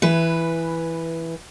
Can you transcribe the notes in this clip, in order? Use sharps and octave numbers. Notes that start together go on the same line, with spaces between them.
E3 B4